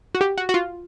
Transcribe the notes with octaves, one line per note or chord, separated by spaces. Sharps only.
F#4
G4
F#4
F#4
F4